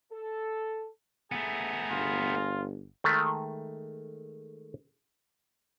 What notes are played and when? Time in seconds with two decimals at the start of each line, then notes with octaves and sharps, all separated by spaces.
0.12 A4
1.32 A3 B3 G#4 A#5
1.90 G1 F4
3.04 D#3 G#3 A3